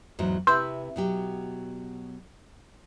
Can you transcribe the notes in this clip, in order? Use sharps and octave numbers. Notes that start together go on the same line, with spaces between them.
E2 G#2 F#3
C3 E4 B4 C6 E6 G6
B2 F#3 G4